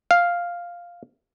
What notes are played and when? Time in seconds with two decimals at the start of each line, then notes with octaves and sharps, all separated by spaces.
0.11 F5